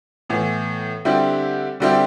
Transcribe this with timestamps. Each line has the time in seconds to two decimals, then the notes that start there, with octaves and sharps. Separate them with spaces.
0.29 A2 E3 B3
1.05 D3 G3 C4 E4 G4
1.80 D3 G3 C4 E4 G4